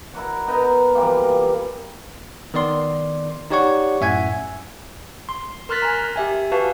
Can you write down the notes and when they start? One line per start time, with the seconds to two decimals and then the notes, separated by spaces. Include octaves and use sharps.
0.14 E4 A#4 D5 F#5
0.47 B3 D#4 A#4
0.95 E3 F3 G3 A#3
2.54 D#3 B3 D5 C6
3.50 D#4 G4 C#5 D5 F#5 C#6
4.01 F#2 A2 E5 F#5 G#5 G#6
5.29 C6
5.69 A#4 C6 F6 F#6 A6 B6
5.82 G#5 A#5
6.16 G4 E5 G#5
6.52 F#4 B4 F5 A5